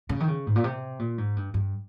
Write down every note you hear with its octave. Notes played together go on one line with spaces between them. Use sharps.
C#3
D#3
C#3
G#2
A#2
C3
A#2
G#2
G2
G2